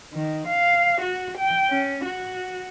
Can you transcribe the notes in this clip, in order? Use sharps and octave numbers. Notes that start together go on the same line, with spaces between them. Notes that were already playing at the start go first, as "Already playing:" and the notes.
D#3
F5
F#4
G5
C#4
F#4